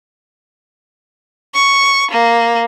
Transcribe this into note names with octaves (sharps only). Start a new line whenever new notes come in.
C#6
A#3